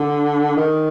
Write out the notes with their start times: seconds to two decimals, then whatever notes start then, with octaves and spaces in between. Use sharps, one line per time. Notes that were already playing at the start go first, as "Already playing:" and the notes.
Already playing: D3
0.57 D#3